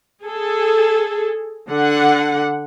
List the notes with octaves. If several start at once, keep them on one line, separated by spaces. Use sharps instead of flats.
G#4 A4
D3 F#5